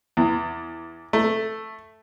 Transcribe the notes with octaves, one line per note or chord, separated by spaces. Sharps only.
E2
A3